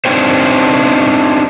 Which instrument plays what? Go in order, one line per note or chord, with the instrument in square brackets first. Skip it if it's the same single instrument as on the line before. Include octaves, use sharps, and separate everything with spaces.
[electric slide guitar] C4 D4 D#4 G4 C5 C#5